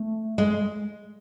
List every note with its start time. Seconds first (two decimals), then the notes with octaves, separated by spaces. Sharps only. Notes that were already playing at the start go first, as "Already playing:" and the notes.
Already playing: A3
0.38 G#3
0.53 G#3